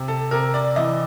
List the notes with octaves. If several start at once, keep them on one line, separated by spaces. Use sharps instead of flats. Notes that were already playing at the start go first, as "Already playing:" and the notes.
Already playing: C3
A4
C3 A#4
D5
E3 D#5